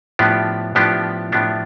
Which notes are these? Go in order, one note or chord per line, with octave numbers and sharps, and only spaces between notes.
A2 F3 B3 D4 G4
A2 F3 B3 D4 G4
A2 F3 B3 D4 G4